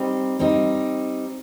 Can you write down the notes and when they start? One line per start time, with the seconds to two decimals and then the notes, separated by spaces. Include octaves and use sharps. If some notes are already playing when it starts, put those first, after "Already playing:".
Already playing: G3 C4 D#4
0.39 G3 C4 D#4